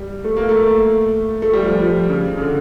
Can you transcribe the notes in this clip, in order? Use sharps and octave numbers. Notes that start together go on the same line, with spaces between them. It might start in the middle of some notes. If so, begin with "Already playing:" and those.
Already playing: G3
A3
A#3
A3
A3
G3
F3
F3
C#3
C#3
D3